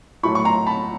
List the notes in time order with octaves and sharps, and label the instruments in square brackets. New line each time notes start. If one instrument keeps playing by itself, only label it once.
[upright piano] A2 F#3 A3 B5 C#6
C#6
A#5 C6
A5 B5